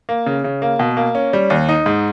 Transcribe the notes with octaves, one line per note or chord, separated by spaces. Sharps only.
A#3
C#3
C#3
A#3
B2
A#3
C#4
G3
D#2
D#4
G#2